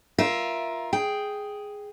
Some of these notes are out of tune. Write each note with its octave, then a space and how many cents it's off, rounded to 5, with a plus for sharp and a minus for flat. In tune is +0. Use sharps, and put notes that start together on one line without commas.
F4 +0 A#4 +20 E5 +0
G#4 +0 G5 +0